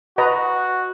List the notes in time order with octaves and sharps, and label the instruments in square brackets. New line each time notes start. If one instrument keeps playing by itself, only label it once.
[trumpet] F#4 [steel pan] B4 D#5 A#5